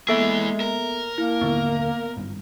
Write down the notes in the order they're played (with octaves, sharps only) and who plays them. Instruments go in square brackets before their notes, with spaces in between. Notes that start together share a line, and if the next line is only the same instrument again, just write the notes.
[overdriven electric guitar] E3 G#4 [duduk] G#3 [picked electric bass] A#3 [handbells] B3 A4 E5
[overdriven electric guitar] A#4
[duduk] A#3 [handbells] E4
[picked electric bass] D#1 G#1 D3 [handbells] B3
[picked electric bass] G#1 G2